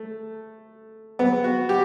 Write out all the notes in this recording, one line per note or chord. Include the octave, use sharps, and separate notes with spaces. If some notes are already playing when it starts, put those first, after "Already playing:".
Already playing: A3
B3
F#4
G4